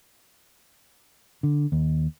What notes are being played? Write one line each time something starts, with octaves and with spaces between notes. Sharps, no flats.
D3
D#2